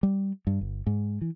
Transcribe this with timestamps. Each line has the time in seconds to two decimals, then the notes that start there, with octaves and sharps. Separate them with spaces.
0.03 G3
0.47 G2
0.61 G1
0.87 G#2
1.21 E3